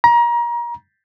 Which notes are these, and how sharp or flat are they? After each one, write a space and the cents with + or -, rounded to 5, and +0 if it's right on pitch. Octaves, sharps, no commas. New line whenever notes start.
A#5 +30